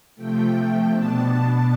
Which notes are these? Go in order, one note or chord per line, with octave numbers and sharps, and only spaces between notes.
C3 F3 A3 G5
B2 B3 D4 A5